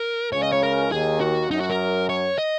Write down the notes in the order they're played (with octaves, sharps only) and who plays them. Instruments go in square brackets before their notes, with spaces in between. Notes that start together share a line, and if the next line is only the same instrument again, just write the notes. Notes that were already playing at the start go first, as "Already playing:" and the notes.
Already playing: [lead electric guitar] A#4
[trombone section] C#2 C#3 [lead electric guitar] C#5
[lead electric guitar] D#5
C#5
A#4
[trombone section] D#2 D#3 [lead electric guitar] G#4
[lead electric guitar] F#4
[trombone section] F#2 F#3 [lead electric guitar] D#4
[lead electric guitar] F#4
A#4
C#5
D#5